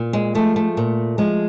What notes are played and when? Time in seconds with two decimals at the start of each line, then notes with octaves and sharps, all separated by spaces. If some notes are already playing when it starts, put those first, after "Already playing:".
Already playing: A#2
0.13 G#3
0.35 F3 G#3 A3
0.56 A3
0.77 A#2
1.18 F3 G#3